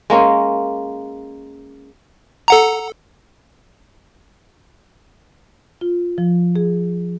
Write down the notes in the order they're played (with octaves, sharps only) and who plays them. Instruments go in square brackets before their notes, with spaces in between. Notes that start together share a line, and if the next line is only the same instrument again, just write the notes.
[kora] G#3 A#3 C#4
[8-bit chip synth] A4 F#5 A#5
[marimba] F4
F3
G#4